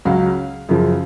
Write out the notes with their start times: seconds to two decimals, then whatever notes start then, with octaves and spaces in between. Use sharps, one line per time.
0.05 C#2 C#3 F#3 F5
0.69 F#2 C#3 F3